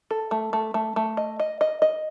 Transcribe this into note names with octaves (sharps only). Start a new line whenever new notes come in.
A4
A3
A3
A3
A3
D#5
D#5
D#5
D#5